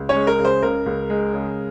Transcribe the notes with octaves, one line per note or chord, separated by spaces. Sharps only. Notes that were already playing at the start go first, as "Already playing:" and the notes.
Already playing: C#2
C#4 C#5
G#3
A#4
C#3
C5
C#2 A#4
C#2
G#3
C#3